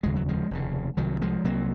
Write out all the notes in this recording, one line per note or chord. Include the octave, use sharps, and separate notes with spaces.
F1 D#2 C#3 G#3
F#3
F3 G#3
F1 D#2 C#3
C2 C3 D#3 F#3
F3 G#3
C2 C3 F#3 A#3